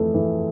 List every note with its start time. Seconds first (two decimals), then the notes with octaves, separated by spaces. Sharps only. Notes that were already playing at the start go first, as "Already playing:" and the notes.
Already playing: F2 E3 A3
0.14 E3